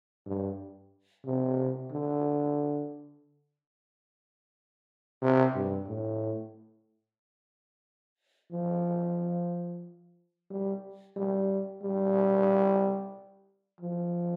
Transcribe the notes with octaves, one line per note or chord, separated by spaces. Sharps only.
G2
C3
D3
C3
G2
A2
F3
G3
G3
G3
F3